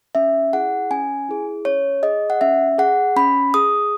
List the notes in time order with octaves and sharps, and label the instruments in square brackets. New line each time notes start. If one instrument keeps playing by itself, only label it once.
[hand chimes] C#4 E5
E4 G#4 F#5
C#4 G#5
E4 G#4
C#4 C#5
G#4 D#5
F#5
C#4 E5
G#4 F#5
C#4 B5
G#4 D#6